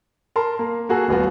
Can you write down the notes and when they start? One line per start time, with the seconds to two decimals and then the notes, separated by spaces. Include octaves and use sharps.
0.36 A#4 A5 C6
0.59 A#3
0.89 A#3 F#4 G#4 A4
1.08 D#1 A1 B3 F4 F#4